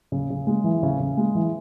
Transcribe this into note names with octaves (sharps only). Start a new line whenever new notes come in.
C#3
C#3
G#3
E3
C#3
C#3
G#3
E3